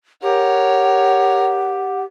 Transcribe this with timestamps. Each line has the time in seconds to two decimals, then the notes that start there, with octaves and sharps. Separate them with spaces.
0.22 G4 A#4 C#5 F#5